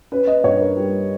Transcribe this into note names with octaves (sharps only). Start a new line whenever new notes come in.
C#4 B4
D#5
G2 C#5
A#4
G3